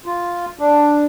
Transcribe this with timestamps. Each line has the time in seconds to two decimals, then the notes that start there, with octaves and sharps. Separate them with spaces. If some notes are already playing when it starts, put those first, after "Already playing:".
0.06 F4
0.59 D4